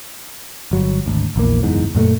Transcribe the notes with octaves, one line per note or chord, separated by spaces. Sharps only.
G1 F#3
G#1 D2
A#1 E2 A#3
F#1 E2 G#2
F#2 A#2 G#3 A3